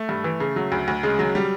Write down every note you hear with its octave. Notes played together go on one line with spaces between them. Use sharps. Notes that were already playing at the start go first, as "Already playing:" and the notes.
Already playing: A3
G2
E3
C#3
F#3
D2
D2
C#3 G#3
F#3
G3